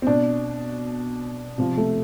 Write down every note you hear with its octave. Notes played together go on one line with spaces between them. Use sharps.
C4
B2 D4
C3 F3
A3